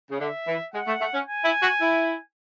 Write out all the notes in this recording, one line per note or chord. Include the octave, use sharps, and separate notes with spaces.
C#3
D3 E5
E3
G#3 F#5
A3
A3
C#4
G#5
E4
F#4
E4